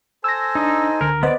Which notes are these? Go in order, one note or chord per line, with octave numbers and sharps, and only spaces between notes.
A4 C5 G#5 E6 A#6
D4 D#4
C#2 D3 A#4
B3 B4 C5 D5 D#5